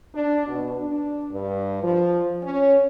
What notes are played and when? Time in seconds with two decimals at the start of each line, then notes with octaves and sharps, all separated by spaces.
0.15 D4
0.48 B2
0.81 D4
1.32 G2
1.84 F3
2.43 C#4